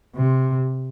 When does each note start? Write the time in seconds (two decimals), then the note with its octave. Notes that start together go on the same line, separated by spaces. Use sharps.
0.16 C3